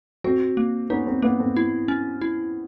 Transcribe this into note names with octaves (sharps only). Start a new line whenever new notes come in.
C4 F#4
A#3
B3 C#4 D#4
C4
A#3 B3
C4
E4
C#4
E4